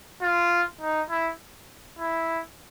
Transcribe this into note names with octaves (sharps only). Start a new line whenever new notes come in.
F4
D#4
E4
E4